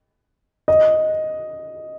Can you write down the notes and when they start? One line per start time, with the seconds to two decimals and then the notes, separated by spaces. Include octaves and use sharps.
0.68 D#5